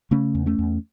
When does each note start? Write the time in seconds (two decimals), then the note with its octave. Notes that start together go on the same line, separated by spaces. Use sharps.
0.11 C#3 A3 C#4
0.35 E2
0.46 A3 C#4
0.59 E2